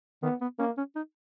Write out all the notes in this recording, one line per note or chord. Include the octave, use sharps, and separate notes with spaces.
D#3 B3
B3
A#3 C#4
C#4
D#4